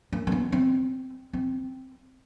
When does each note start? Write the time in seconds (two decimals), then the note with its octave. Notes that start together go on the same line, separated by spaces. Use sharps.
0.12 A#3
0.27 A#3
0.32 B3
0.52 C4
1.33 C4